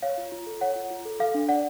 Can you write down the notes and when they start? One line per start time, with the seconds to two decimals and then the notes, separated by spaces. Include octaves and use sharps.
0.02 C#5 F5
0.18 F4
0.32 F4
0.47 A4
0.61 C#5 F#5
0.75 F4
0.90 F4
1.05 A4
1.20 A4 F5
1.34 D4
1.48 D5 F#5